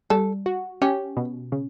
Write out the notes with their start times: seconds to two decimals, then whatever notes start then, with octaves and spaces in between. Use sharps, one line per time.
0.10 G3 A4
0.46 F#4
0.82 C#4 G4
1.17 B2
1.52 C#3